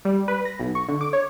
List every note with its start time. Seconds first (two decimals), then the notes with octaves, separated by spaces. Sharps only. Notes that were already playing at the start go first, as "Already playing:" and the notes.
0.05 G3
0.28 B4
0.45 A#6
0.60 B1
0.75 C#6
0.89 D3
1.01 D6
1.13 C#5